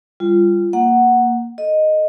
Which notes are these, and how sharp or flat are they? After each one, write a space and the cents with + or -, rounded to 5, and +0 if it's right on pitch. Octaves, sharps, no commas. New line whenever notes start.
G3 +20 F4 -15
A#3 +0 F#5 +0
A4 -15 D#5 -5